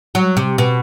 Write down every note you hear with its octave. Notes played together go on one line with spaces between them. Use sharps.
F#3
C3
B2